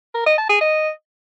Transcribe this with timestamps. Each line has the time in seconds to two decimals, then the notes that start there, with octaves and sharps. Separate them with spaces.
0.15 A#4
0.26 D#5
0.38 A5
0.49 G#4
0.61 D#5